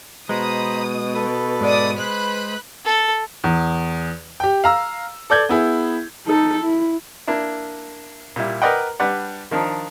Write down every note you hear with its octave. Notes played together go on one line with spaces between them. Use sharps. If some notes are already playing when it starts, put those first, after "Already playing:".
B2 G#3 C5 A#5 B5 D#6
A4 B4
G#2 G#3 B3 D5 D#6
G#3 B4 C5 B5 F#6
A4
E2
G4 G5
F5 A#5 E6
A4 D5 G6 G#6
B3 E4 G#4
D#4 A4
E4
A#3 D4 E4
A#2 G3 E4
A#4 B4 D5 D#5 F#5 G5
G3 D4 B4 D5 F#5
D#3 F3 D4 D#4